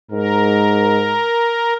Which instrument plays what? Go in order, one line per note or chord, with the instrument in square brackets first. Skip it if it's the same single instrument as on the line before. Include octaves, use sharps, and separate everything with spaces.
[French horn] G#2 [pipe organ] A#4